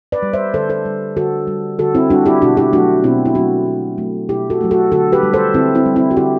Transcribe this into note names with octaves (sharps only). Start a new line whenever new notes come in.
B4 D5
G3
C5 E5
D3 A4 C5
A4 C5
G3
D3 F#4 A4
G3
D3 F#4 A4
C4 E4
G3 D4 F#4
E4 G4
B2 D4 F#4
E4 G4
F#3 A3 D4 F#4
B2 C4 E4
E4
F#3 A3 D4 F#4
B2
F#3 A3
B2 E4 G4
F#4 A4
F#3 A3
F#4 A4
D3 F#4 A4
G4 B4
G3
A4 C5
D3 C4 E4
C4 E4
G3
C4 E4
F#4
D3 E4 G4